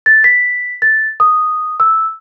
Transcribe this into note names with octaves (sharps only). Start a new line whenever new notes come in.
A6
B6
A6
D#6
E6